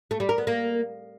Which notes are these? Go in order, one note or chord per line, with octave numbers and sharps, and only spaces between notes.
A3
G3
A#4
B3
A#3